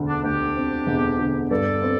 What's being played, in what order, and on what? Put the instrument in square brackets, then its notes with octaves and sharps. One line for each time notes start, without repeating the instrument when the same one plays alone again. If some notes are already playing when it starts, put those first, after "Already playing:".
Already playing: [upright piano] E1 D2 D3
[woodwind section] D4
[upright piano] D2 [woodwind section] D4 G4
[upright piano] C4
E1
D3
[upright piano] G2 [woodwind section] A4 D5
[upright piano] C4